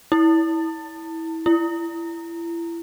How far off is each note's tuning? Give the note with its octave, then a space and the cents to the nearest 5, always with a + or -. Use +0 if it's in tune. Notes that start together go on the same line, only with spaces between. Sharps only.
E4 -20
E4 +30